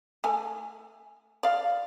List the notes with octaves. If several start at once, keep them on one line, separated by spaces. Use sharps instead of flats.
A3 G#5
D5 F5